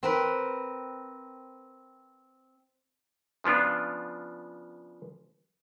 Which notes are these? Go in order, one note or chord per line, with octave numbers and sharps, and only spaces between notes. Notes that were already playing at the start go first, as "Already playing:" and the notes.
C4 A#4 B4
C#3 F3 B3 D4 F4